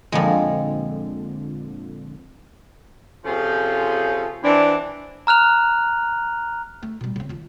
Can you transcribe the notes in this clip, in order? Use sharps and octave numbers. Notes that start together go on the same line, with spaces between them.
F2 A#2 D3 F3 G#3
C3 F3 C#4 F4 G#4 A4
E3 C4 D4
A#5 F6 F#6 F7
A3
B2 G3
C#3 C4
D#2 F4